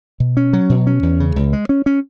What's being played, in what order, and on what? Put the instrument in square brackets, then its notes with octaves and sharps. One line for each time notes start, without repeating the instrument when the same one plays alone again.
[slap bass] B2
C#4
F#3
B2
C#4
E2
C#3
C#2
G#3
C#4
C#4